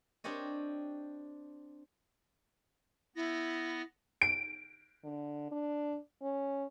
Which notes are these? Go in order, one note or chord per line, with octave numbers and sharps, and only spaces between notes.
C4 D4 G4 C#5 D#5
B3 E4 A#6
D7
D3
D4
C#4